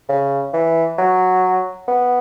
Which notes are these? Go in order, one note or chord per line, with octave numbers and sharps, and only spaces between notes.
C#3
E3
F#3
B3